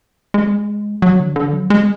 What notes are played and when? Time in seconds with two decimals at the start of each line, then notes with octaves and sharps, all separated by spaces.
0.34 G#3
1.02 F#3
1.20 D3
1.36 D3
1.53 F#3
1.70 G#3